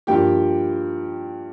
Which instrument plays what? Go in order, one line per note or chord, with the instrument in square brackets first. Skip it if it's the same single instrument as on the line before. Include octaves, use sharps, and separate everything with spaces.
[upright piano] G2 F3 A#3 G4 G5